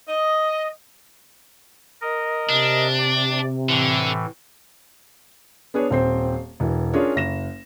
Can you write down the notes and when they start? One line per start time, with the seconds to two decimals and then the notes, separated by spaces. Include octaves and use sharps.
0.08 D#5
2.01 A#4 D#5
2.49 C3 D4
2.99 D5
3.69 A2 D3 E3
5.74 B3 D4 G#4 B4 C#5
5.91 D#1 C4 C5
6.60 E1 E3
6.94 C#4 D4 F4 G#4 A#4 C#5
7.16 F#1 A#6 E7